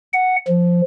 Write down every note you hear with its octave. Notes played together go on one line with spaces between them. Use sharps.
F#5
F3